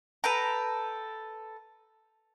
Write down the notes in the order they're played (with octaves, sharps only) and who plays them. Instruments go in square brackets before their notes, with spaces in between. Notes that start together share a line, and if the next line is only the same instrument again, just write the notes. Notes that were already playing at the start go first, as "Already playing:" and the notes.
[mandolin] A4 B4 G5 A#5